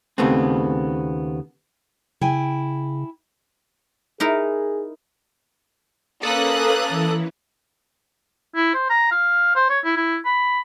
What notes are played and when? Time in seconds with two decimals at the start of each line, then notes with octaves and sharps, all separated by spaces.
0.18 D#2 C#3 A3 B3 C4
2.21 C#3 E4 G5 G#5
4.20 D#4 E4 G#4 A#4
6.23 A#3 C#4 A4 B4 D#6 F#6
6.89 E3
8.56 E4
8.74 C5
8.90 A#5
9.11 F5
9.55 C5
9.69 C#5
9.84 E4
9.96 E4
10.25 B5